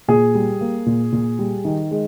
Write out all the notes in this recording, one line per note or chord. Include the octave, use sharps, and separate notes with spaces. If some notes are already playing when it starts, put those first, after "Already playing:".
A#2 G#4
G3
A#3
A#2
A#2
G3
D#3
G#3